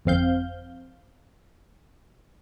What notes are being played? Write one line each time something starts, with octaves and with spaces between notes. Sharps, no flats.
G1 F2 C4 F5 G6